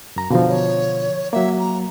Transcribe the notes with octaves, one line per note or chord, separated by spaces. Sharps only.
F#2 A#5
B2 D3 F3 F5
C#5
F#3 A#3 E5
A#5